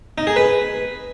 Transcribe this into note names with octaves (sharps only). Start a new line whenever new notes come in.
D#4
G#4
B4